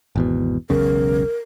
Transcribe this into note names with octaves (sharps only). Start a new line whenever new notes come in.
G#1 E2 B2
E1 B1 C#3 A#4